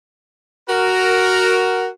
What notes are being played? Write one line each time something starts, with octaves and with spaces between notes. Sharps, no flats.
F#4 A#4